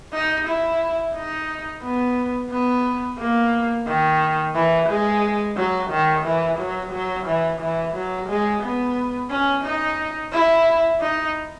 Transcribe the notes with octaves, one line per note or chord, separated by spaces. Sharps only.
D#4
E4
D#4
B3
B3
A#3
D#3
E3
G#3
F#3
D#3
E3
F#3
F#3
E3
E3
F#3
G#3
B3
C#4
D#4
E4
D#4